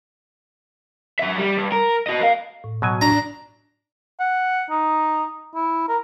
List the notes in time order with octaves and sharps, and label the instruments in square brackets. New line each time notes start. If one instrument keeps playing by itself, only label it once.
[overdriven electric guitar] F#3 E5
G3
G2
A#4
F#4 D#5
A#4 F5
[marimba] A2
[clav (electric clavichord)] B2 F#3 G#5
[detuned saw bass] D4 [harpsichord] A#5
[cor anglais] F#5
D#4
E4
A#4